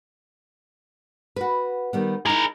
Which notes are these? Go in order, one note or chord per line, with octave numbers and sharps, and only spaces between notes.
F#4 B4
D#3 G3 B3
D#4 E4 G#4 A#4